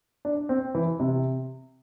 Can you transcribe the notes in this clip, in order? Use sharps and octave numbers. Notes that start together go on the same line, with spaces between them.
D4
C4
E3
C3